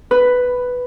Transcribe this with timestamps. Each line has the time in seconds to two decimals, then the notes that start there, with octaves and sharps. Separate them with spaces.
0.11 B4